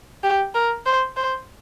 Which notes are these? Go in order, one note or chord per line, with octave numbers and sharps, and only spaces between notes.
G4
A#4
C5
C5